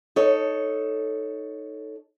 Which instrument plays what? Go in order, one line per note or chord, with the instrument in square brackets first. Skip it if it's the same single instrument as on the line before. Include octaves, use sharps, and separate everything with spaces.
[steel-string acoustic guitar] D#4 A4 C#5